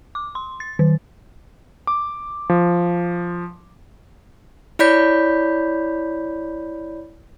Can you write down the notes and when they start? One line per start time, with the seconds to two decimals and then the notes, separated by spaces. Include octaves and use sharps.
0.15 D6
0.35 C6
0.60 A6
0.79 D#3
1.87 D6
2.50 F3
4.79 E4 C#5 D5 B5 G6 B6